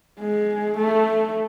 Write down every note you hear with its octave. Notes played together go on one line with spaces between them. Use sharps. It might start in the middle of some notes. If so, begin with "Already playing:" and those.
G#3
A3